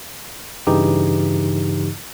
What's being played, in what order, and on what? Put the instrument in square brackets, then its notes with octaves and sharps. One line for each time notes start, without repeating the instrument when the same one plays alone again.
[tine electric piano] G2 C#3 E3 D#4 G4